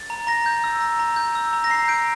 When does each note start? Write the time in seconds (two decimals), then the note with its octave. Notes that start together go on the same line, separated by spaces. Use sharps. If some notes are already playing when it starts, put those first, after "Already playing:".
Already playing: A6
0.10 A#5
0.27 A#5 A#6
0.46 G6
0.64 E6
0.81 A#5
0.99 A#5
1.16 G6
1.35 E6
1.53 A#5
1.64 A#6
1.70 A#5 C7
1.88 G6 D7